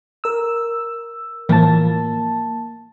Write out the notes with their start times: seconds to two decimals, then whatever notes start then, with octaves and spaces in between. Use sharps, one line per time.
0.24 A#4 E6
1.49 A2 E3 F3 A#3 A5